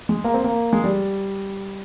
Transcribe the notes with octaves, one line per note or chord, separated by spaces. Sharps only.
G#3
A#3
C4
A#3
G#3
G3